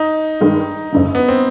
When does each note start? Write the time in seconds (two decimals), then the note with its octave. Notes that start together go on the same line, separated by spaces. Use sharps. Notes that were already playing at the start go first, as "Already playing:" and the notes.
Already playing: D#4
0.41 G2 D#3 G#3
0.92 F#1 F#2 D3
1.15 B3
1.28 C4